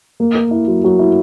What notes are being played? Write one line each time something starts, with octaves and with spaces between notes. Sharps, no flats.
A#3
A#4
E4
F#3
F#3
E4